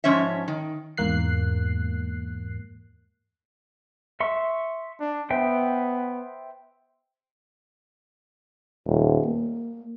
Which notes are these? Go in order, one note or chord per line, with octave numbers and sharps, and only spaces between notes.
G#2 F3 C#4 C#5 E5
D#3
E2 G#2 A#3 F#6 C7
E5 C6 C#6
D4
B3 C5 E5 G5
D#1
A#3